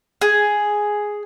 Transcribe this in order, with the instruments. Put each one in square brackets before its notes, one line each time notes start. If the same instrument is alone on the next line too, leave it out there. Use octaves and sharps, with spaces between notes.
[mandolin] G#4